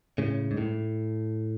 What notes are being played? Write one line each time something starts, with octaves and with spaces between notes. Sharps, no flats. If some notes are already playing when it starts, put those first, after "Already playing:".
A2 C#3
G#2
A2